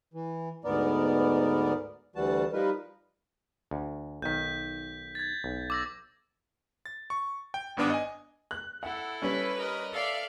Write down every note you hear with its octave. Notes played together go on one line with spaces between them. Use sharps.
E3
D2 G#2 B3 A#4 D5
D2 E3 G3 F#4 A5
F3 G3 D#4 A#4 B4
D2
B1 D#3 G6 B6
G#6 A6
B1
D6 E6 A#6
A6
C#6
G5
G#1 G2 B3 D4 D6 D#6
D#5 G#5
F#6
E4 A4 F#5
G3 C#4 B4
A#4 D#5
A4 D5 E5 F5